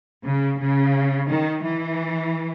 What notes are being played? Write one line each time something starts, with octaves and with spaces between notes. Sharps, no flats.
C#3
C#3
D#3
E3